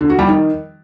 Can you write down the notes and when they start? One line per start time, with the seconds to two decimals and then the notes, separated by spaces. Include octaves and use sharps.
0.01 D3
0.10 F#4
0.19 G3
0.28 D#3